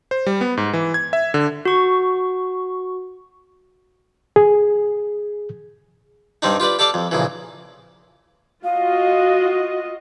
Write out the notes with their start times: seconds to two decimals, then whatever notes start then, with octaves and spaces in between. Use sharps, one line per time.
0.11 C5
0.26 G3
0.41 B3
0.57 G#2
0.73 E3
0.94 G#6
1.13 E5
1.34 D3
1.65 F#4 C#6
4.36 G#4
6.42 G2 G3 C4 D4 D#4
6.60 F4 G4 B4 D5
6.79 G4 A4 D5 F5 A5 D6
6.94 F2
7.11 A#1 C#3 E3
8.64 F4 F#4 D#5 F5